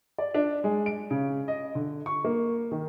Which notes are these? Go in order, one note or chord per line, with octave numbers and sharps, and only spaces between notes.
D5
D4
G#3
D7
C#3
D#5
D3
C#6
A#3
D#3